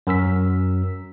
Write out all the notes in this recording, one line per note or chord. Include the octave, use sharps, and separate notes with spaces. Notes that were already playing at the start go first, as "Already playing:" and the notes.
F#2 A#4 E6 B6